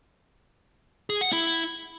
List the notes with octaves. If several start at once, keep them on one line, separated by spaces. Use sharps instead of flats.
G#4
F#5
E4